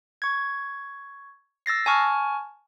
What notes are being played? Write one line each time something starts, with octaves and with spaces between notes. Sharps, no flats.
C#6 G#6
E6 A6 A#6 C7
G#5 A5 C#6 F6